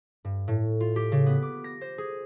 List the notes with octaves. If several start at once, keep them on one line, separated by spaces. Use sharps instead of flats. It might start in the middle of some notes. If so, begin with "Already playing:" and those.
G2
A2
F4
G4
C#3
B3
D6
A#6
C5
G#4